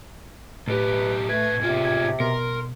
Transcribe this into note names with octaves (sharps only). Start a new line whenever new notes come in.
B1 A2 G4 B4
A#2 A3 B4 G#6
G#2 C3 F4
G#6
B2 A#4 C6